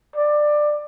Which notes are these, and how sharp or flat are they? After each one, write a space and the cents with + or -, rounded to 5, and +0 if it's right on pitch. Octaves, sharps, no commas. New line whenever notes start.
D5 +20